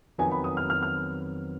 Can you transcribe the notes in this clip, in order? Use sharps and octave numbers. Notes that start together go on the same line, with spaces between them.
F2 D#3 F#3 B3 G#5
B5
D#6
F6
F6
F6